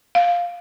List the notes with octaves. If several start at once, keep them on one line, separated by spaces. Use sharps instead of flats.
F5